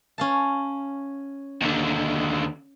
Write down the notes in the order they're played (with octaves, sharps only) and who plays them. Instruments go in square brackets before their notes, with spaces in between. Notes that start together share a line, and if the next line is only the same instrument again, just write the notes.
[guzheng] C#4 F5 A5
[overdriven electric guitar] D#2 D3